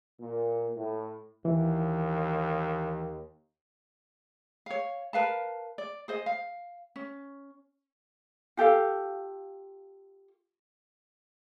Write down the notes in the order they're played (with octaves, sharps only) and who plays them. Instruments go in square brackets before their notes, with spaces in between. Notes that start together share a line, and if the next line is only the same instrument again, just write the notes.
[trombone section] A#2
A2
[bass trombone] D#2 [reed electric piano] E3
[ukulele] C#5 F5
A#4 B4 F5 A5
D5
G#4 C5 D#5
F5
C#4
F4 G4 A4 F5